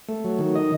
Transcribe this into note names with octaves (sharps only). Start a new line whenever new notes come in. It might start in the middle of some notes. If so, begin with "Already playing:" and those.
A3
F#3
D#3
D#5